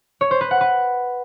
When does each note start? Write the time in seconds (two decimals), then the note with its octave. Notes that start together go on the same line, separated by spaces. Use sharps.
0.21 C#5
0.31 C5
0.41 B4
0.51 F#5
0.61 B4